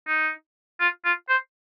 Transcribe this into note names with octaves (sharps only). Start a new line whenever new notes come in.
D#4
F4
F4
C5